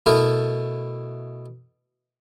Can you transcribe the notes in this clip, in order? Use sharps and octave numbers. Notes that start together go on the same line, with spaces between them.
B2 A3 B3 E4 A#4